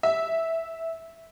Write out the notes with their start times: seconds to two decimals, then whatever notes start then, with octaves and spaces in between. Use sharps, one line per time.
0.03 E5